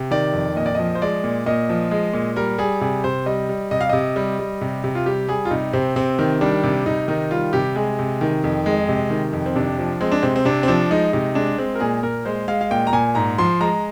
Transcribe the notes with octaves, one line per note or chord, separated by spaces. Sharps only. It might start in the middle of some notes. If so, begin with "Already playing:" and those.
Already playing: C3
D#3 D5
F2
A#2 D#5
D5
F3 D#5
C5
G#3 D5
A#2
A#2 D#5
F3
G#3
A#2
G3 A#4
G3 G#4
C3 G#4
C3 C5
G3 D#5
G3
C3 D#5
F5
C3 D#5
G3
G3
C3
C3
F4
G3 G4
G3 G#4
F4
C3 D#4
C3 C4
C3 C4
D#3
G3 D4
C3
C3 D#4
D#3 D#4
G3 F4
C3 G4
G#3 G#4
C3
D#3
F2
G#3
C3
D#3
F2
C4
C3 D4
F3
G#3 C4
D4
C3 C4
C4
C3 D4
C4
F3 D4
G#3 D#4
C3 D#4
G#3 D4
G#3 C4
A#4
A#2 G#4
A#2 A#4
G#3 C5
G#3 F5
F5
A#2 G5
A#5
A#2 G#5
G#2 A#5
F3 C6
G#3 A#5